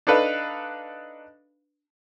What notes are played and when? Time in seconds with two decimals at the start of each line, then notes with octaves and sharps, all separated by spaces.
0.07 D4 D#4 A4 B4 F5